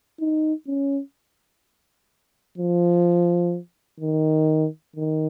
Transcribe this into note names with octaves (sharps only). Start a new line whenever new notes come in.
D#4
C#4
F3
D#3
D#3